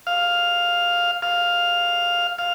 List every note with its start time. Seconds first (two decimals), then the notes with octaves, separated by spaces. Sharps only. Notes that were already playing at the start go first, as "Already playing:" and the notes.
0.07 F5
1.22 F5
2.39 F5